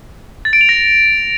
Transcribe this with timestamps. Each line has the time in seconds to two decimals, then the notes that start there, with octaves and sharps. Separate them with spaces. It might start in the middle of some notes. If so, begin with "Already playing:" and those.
0.45 A6
0.53 D7
0.61 F7
0.69 A#6